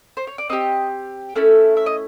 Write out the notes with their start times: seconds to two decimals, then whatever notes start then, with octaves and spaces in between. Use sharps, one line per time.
0.17 C5
0.27 C#5
0.38 D5
0.50 C4 D#4 G4 D#5
1.35 A3 C#4 E4 A4
1.77 E5
1.86 D#5